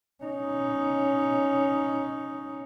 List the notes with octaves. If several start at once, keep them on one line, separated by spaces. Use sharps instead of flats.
C#4 D#4